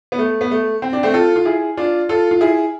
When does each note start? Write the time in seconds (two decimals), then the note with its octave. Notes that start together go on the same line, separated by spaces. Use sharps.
0.12 B3
0.18 A3
0.41 B3
0.51 A3
0.82 C4
0.93 D4
1.03 A3 C4
1.14 F4 A4
1.36 F4
1.45 E4 G#4
1.77 D4 F4
2.09 F4 A4
2.31 F4
2.41 E4 G#4